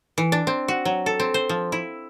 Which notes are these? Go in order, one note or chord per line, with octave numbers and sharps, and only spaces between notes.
E3
D4
C4
F#4
F#3
A4
C4
C5
F3
E4